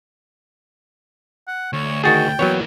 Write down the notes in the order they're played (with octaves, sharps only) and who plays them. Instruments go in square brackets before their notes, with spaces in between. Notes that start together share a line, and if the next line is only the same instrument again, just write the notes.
[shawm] F#5
[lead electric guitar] D2 [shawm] C#5
[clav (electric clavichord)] D#3 F#4 G#4 [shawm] G5 [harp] A6
[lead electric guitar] E3 A#3 [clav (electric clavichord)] F#3 B3 C#5